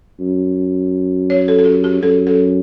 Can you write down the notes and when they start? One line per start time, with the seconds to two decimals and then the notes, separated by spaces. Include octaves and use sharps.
0.20 F#2
1.30 C#5
1.48 A4
1.59 A4
1.65 G4
1.84 G4
2.02 F#2 A4
2.27 A4